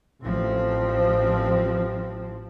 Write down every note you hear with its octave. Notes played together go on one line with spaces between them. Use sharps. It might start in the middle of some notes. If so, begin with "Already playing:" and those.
A1 F3 C4